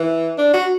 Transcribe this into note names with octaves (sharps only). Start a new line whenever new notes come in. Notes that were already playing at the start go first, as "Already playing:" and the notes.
Already playing: E3
D4
F#4